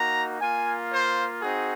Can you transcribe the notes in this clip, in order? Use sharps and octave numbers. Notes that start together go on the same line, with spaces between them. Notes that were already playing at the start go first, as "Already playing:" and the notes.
Already playing: A#3 D#4 F#4 A#5
A#3 F4 G#5
C5
C4 D#4 F#4 G#4